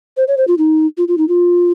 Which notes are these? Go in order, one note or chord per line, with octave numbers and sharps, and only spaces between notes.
C5
C#5
C5
F4
D#4
F4
F4
D#4
F4